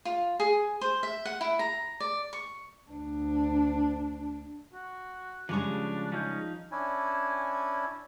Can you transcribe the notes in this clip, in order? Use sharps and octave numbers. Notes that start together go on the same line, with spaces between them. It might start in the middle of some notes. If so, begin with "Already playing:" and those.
F4
G#4
C5
E5
F#5
E4
A#5
D5
C#6
D2 D4
F#4
C#3 F3 G3 G#3 C#4 D4 C#6
F3 C#4 D#4 G6
C#4 D4 E4 G#5